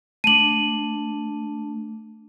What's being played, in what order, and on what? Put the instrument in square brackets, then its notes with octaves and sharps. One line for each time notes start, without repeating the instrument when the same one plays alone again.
[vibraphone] A3 D4 [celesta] D#7 F#7